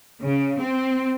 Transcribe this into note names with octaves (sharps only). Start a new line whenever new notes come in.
C#3
C4